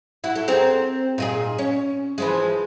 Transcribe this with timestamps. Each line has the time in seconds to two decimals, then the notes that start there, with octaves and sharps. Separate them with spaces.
0.24 E4 F#4
0.35 A4
0.48 C4 G#4 A#4
1.18 A#2 D#4 G#4
1.59 C#4
2.18 E3 F3 G#3